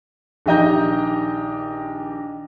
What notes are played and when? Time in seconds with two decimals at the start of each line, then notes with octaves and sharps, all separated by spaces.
0.46 A#1 D#3 G4 D#5 A#5 G6